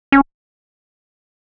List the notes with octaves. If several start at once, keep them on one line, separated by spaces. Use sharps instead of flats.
C#4